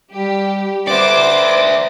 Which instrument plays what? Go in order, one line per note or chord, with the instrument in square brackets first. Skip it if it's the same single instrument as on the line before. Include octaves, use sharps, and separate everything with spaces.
[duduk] G3 [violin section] G4
[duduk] B4 [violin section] C5 D6 [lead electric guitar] D5 E5